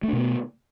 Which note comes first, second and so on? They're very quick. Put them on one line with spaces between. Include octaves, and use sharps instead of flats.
A3 D4 B2 B3